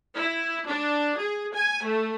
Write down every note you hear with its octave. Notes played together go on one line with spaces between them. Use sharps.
E4
D4
G#4
G#5
A3